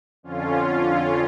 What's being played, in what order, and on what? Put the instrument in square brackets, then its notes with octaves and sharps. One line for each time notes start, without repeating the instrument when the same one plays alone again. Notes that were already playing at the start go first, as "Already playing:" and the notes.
[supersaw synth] F2 D3 C#4 F4